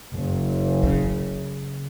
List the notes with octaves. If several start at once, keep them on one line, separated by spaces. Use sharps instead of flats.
F#1
C#3